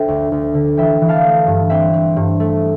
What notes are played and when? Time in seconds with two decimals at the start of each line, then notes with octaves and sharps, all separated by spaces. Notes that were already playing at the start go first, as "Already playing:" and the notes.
Already playing: D3 A4 C5 E5 G5
0.08 D2
0.32 D2
0.54 D3
0.77 E3 E5 G5
1.01 E3
1.09 F5 A5
1.24 A3
1.47 G2
1.70 C4 E5 G5
1.94 C4
2.17 G2
2.40 A3